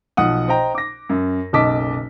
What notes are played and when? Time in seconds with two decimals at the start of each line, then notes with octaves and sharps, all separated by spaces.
0.17 B1 F3 F#5 D#6
0.48 C5 D#5 G5 A#5
0.75 D6 A#6
1.09 F#2
1.53 F#1 B1 D#5 A5 D6 B6